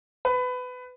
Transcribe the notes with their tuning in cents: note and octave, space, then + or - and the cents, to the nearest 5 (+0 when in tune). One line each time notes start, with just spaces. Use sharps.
B4 +20